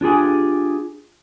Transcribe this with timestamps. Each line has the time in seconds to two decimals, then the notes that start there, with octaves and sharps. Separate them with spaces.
0.01 D4 F4 G4 G#4